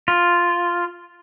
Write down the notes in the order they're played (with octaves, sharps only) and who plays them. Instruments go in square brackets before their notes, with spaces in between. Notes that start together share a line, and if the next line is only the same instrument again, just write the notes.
[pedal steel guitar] F4